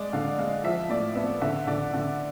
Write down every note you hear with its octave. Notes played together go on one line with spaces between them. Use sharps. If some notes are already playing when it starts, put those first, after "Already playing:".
Already playing: G#3 D5
D3 F5
G#3 F5
F3 E5
A2 D5
B3 E5
D3 E5
D3 D5
D3